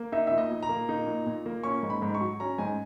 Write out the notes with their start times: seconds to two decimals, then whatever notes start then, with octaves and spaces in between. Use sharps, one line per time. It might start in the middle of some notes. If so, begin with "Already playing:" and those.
Already playing: A#3
0.12 D#4 E5
0.27 A#2 E5
0.38 D#5
0.51 A#2
0.63 A#5
0.69 A#3
0.89 D#4
1.07 A#2
1.26 A#2
1.46 A#3
1.64 C#4 C#6
1.83 G#2
1.90 B5
2.02 G#2
2.14 C#6
2.21 F#3
2.40 C#4 A#5
2.58 G#2 G#5